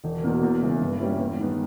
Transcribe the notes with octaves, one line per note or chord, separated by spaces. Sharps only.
E1
E2 B2 A#3
E2
C#3 E3 G#3
G2
G3 A#3 C#4 E4
E2
D#3 G#3 B3